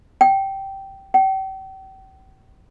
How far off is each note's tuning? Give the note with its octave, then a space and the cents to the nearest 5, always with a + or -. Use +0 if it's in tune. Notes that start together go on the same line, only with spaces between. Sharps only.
G5 -10
G5 -40